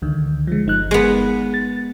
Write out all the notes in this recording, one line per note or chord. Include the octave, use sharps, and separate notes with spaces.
C#2 D3 D#3
F3 G#3
G1 D#4 F#6
G#3 B3
A6